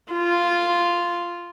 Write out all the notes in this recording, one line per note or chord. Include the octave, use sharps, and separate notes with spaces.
F4